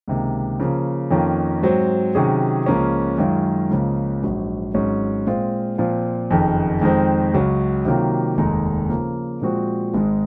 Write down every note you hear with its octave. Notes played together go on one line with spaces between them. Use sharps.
C#2 C3 D#3 A#3
C#3 F3 A#3
F2 D#3 A#3 C#4 F4
G#2 F#3 C4
C3 D#3 F#3 C#4 G#4
C#2 C#3 F3 A#3 C#4
F#2 D#3 G#3 C#4 F4
C#2 C#3 F3 A#3
A#1 G#2 F#3
G#1 G#2 F#3 C#4
A#2 G#3 C4 F4
A#2 F3 C4 F4
F#1 F2 D#3
F2 D#3 G#3 C4
C#2 C#3 F#3 C#4
C3 D#3 F#3 A#3 F4
F1 D#2 D#3 G#3 D#4
C#3 F3 A#3
A#2 F3 G#3 C4 F#4
G#1 G#2 D#3 G#3